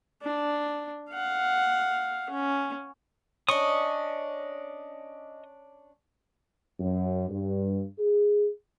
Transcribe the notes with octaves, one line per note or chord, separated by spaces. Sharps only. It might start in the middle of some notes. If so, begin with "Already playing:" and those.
D4
F5 F#5
C#4
C#4 D4 D#5 C#6 D#6
F#2
G2
G#4